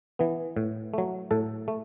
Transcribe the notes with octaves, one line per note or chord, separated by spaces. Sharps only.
E3 B3
A2
F#3 A3
A2 A4
A3